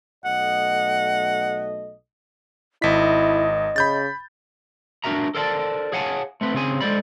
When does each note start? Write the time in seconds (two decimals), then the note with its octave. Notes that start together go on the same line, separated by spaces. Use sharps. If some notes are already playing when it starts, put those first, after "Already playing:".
0.25 B1 A3 D#5 F#5
2.82 G#1 E4 D#5 B6
3.76 C#3 B5 G6 A6
5.04 D4 D#4 F#4 A#4 E5 A#5
5.35 A4 A#4 C5 D5 F5 A5
5.92 G#4 C#5 F5 F#5 G#5 A5
6.41 A3 C4 B4
6.54 C#3 C4 G#4 G#5
6.81 G#3 A4 C5 D5 B5